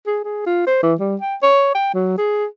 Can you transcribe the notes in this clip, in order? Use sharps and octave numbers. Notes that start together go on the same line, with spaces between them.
G#4
G#4
F4
C5
E3
G3
G5
C#5
G5
F#3
G#4